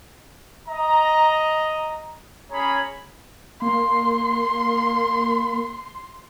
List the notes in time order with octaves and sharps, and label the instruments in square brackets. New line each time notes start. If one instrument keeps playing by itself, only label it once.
[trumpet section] D#5 A#5
C#4 G#4 C#5 A#5 B5
[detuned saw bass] A#3 [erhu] C6